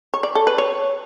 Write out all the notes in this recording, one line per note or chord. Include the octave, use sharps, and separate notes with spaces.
C#5
D5
A4
B4
C#5